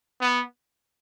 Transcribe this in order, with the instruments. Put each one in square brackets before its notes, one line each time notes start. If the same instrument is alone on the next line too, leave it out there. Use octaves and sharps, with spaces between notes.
[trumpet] B3